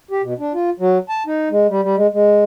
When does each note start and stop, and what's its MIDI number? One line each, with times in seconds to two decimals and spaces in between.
0.11 0.22 67
0.23 0.34 47
0.39 0.53 62
0.54 0.70 65
0.80 0.98 54
1.09 1.23 81
1.27 1.49 63
1.50 1.67 56
1.70 1.81 55
1.82 1.96 55
1.96 2.07 56
2.13 2.44 56